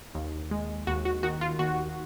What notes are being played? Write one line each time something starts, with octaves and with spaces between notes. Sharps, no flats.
D#2
G#3
D#2 F#4
F#4
D#3 F#4
F4
D#2 F#4